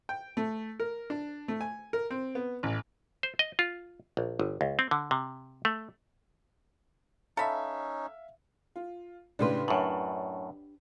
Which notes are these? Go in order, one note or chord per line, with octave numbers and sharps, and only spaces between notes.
G5
A3
A#4
D4
A3
G#5
A#4
C4
B3
A1
C5
D#5
F4
A#1
G1
C#2
C4
D3
C3
A3
C#4 D#4 A4 E5 F5 B5
F4
A2 C#3 D4 G4 B4 C6
F#2 A2 F#7